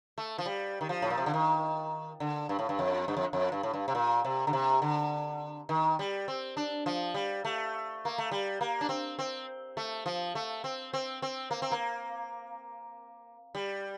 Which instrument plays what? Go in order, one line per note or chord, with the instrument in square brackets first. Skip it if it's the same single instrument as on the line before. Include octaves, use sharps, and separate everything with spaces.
[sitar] A3
F3
G3
D#3
F3
A2
A#2
C3
D3
D#3
D3
G2
A2
G2
F2
G2
F2
F2
G2
A2
G2
C3
A#2
C3
D3
C3
D3
D#3
G3
C4
D4
F3
G3
A3
A#3
A3
G3
A#3
D4
C4
C4
A3
F3
A3
C4
C4
C4
A#3
C4
A#3
G3